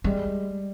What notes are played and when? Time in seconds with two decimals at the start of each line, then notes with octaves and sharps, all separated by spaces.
0.04 G3 G#3